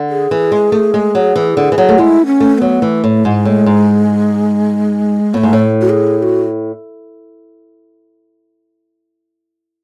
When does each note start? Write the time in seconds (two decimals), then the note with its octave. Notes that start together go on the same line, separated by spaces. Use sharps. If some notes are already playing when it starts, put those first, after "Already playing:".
Already playing: D3
0.10 G#4
0.31 E3
0.52 G#3
0.72 A3
0.94 G#3
1.15 F#3
1.36 E3
1.57 D3
1.72 E3
1.78 F#3
1.89 A3
1.98 G#3 E4
2.26 C#4
2.40 A3
2.55 C#4
2.58 F#3 B3
2.82 E3 A3
3.04 A2
3.24 G#2 G#3
3.45 A2
3.66 G#2
5.34 A2 A3 B3
5.43 G#2
5.53 A2
5.81 F#4
5.89 G#4
6.19 G#4
6.23 F#4